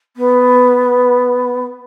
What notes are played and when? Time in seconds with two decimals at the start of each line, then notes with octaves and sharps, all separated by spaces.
0.16 B3